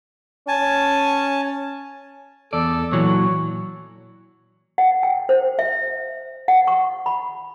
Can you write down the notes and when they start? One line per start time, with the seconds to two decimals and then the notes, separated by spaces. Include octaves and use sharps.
0.48 C#4 G#5 A5
2.53 E2 A4 D5
2.92 A#2 E3 F#3 C#5
4.78 F#5
5.03 G5
5.29 C5
5.59 E5
6.48 F#5
6.67 C#6
7.06 B5